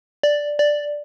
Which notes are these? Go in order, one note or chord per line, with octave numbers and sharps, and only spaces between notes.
D5
D5